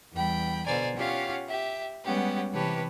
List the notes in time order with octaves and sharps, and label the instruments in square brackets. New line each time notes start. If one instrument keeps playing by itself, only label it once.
[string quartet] E2 G3 G5 B5
B2 D3 C5 D5 G#5 A#5
C#4 F4 G4 C#5 F5 F#5
G4 E5
G3 G#3 B3 C#4 G4 F#5
C3 E3 G4 B4 C#5 A5